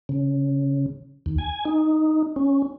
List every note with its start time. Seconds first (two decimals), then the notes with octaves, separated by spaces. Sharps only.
0.09 C#3
1.26 D#2
1.38 G#5
1.65 D#4
2.36 C#4